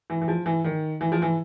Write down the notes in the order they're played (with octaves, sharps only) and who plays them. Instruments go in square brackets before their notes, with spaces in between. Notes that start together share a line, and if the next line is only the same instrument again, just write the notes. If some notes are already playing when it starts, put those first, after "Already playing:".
[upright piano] E3
E3
F3
E3
D#3
E3
F3
E3